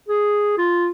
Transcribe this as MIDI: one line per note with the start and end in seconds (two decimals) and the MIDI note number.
0.08 0.55 68
0.57 0.91 65